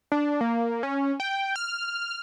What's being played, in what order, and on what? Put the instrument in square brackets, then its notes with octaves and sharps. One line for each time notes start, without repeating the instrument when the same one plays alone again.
[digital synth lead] D4
A#3
C#4
G5
F6